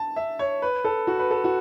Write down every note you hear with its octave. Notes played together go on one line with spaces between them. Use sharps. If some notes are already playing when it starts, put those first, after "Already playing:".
Already playing: A5
E5
C#5
B4
A4
F#4
B4
A4
F#4